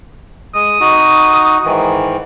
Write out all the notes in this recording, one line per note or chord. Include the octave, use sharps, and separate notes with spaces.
G#3 D#6
D#4 F#4
G#2 D#3 E3